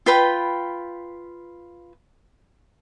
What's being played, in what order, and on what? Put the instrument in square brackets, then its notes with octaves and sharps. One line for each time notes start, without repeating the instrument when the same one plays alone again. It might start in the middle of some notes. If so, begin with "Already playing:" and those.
[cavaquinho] F4 B4 G5 B5